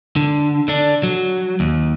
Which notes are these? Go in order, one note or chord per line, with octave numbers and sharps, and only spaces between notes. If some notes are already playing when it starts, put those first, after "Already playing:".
D3
D3 D4
F#3
D#2